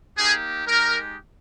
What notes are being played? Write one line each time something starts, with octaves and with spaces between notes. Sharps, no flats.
A#3 D#4 G4 G#4
G#3 D#4 G4 A#4